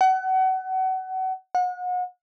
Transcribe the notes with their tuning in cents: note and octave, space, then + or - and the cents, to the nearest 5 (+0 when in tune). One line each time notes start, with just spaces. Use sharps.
F#5 +30
F#5 -35